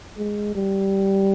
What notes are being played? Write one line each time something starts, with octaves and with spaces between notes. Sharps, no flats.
G#3
G3